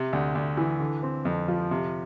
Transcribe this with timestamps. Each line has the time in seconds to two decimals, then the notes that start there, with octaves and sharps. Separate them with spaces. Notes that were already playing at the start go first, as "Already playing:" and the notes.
Already playing: C3
0.13 D2
0.35 D2
0.57 E3
0.80 D3
1.03 C4
1.25 F2
1.48 F3
1.71 C3